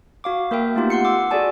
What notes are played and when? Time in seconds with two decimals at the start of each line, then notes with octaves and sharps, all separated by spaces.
0.24 F#4 F5 D6
0.51 A#3 A#4 E5 G5
0.75 A3 B3 D#4 F4 G4
0.90 F#5 C6 C7 C#7
1.05 D6 E6
1.31 F#4 G#4 A4 D5 G#5 A5